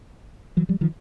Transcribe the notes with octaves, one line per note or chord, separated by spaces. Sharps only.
E3 F#3
F3 G3
D#3 F3